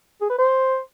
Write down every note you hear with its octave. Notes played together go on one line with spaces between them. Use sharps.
G#4
B4
C5